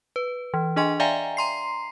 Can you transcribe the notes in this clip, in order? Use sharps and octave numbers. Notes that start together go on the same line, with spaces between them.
B4
E3
D4 G#4 D#5 G#5 C6
D5 E5 F5 G5 G#5 A#5
A#5 C6 C7